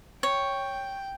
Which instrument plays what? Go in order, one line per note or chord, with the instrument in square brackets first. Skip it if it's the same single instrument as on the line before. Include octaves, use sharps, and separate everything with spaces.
[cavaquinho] C#5 [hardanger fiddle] G5